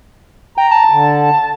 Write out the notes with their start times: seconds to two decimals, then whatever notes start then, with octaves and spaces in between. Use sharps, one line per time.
0.58 G5 A#5
0.71 A5
0.90 D3